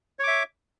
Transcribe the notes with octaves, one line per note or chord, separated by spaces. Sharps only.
C#5 E5 D6